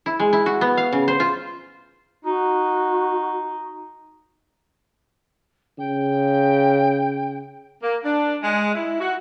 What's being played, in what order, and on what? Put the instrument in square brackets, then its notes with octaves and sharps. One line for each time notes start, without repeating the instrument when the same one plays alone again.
[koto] E4
G#3
E4
F#4
B3
F5
C#3
C5
F4
[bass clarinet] D#4 [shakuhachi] F#4
[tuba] C#3 [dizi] G5
[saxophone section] A#3
D4
G#3
E4
F#4